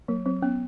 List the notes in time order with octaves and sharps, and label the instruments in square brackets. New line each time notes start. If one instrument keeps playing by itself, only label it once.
[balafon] F#3 [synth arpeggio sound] A#3
[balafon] F#3 [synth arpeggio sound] C4
[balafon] B3 [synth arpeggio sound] C#4